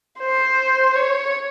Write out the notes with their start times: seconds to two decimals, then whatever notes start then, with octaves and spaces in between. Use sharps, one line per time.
0.20 C5
0.95 C#5